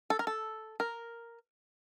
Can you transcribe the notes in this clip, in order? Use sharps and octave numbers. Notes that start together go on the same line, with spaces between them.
A4
A#4
A4
A#4